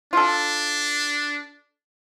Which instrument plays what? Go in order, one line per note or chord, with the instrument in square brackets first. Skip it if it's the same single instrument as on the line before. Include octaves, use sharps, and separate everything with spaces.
[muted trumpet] D4 [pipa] F4 A4